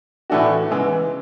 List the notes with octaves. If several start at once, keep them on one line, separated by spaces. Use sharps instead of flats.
A2 E3 A3 D4 F#4
C#3 E3 G#3 B3